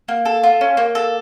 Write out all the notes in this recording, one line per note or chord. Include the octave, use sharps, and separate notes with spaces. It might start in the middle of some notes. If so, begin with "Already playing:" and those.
A#3
A4
F4
C#4
A#3
A4